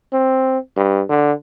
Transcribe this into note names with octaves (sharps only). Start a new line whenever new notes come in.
C4
G2
D3